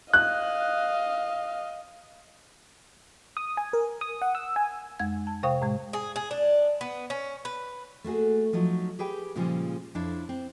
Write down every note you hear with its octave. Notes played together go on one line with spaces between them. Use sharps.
D#5 F5 F#6
D#6
G#5
A#4
D#6
F#5
E6
G#5
F2 G#3 G#6
A5
C3 C5 F5 G5 C#6 D#6
A2 G#3
G#4
G#4
D4
B3
C#4
B4
A3 A#3 F#4 G#4
F3 F#3 D#4 F#4
G4 G#4 B4 G5
A#2 C#3 F3 G3 G#3
F2 D4 E4 C#5 D5 F5
C4